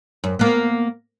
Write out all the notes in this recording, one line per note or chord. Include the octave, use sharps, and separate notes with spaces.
F#2
A#3 B3